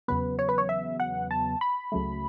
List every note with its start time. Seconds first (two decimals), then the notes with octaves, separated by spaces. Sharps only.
0.08 E2 C#3 F#3 B3 B4
0.39 C#5
0.49 B4
0.58 C#5
0.69 E5
1.00 F#5
1.31 A5
1.61 B5
1.92 C#2 C#3 F#3 A3